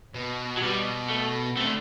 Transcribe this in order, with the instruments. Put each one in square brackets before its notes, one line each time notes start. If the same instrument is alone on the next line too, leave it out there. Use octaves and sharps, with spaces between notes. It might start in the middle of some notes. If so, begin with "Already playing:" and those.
[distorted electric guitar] B2
[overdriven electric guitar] F#3
[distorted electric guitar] B2 [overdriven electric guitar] G3
[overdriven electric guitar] A3
[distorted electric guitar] C3 [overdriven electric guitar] A3
[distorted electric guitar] D3